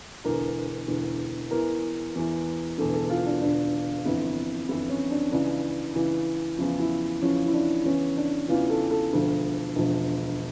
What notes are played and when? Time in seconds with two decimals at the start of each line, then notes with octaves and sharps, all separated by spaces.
0.24 E1 E2 D3 A#4
0.88 E1 E2 D3
1.51 E2 E3 A#4
2.15 E2 E3
2.78 E1 E2 D3 A4
2.94 A4
3.10 F4
3.26 D4
3.41 E1 E2 D3 D4
4.05 G1 F2 E3
4.68 G1 F2 E3 E4
4.90 C#4
5.11 D4
5.31 C#2 C#3 E3 D4
5.96 C#2 C#3 E3
6.58 E2 C#3 F3 E4
6.79 E4
7.22 E2 C#3 F3 C#4
7.46 E4
7.54 D4
7.85 E2 C#3 E3 C#4
8.17 D4
8.49 E2 C#3 E3 F4
8.70 A4
8.91 A4
9.12 E1 D2 D3 F3
9.76 E1 D2 D3 F3